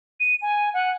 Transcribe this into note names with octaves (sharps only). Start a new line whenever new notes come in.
D#7
G#5
F#5